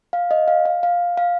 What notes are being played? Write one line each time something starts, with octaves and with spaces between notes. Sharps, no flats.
F5
D#5
F5
F5
F5
F5